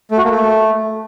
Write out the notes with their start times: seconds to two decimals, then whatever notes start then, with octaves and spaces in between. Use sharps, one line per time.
0.11 A3
0.18 F#4
0.24 A#3
0.31 A3